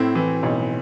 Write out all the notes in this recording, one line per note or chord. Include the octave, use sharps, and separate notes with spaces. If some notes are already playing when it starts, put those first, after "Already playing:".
Already playing: A2 C4 E4
E3
B1